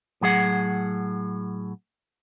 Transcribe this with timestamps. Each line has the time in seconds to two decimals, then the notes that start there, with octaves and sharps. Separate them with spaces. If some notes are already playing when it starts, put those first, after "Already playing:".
0.21 A2 F#3 G#4 F#5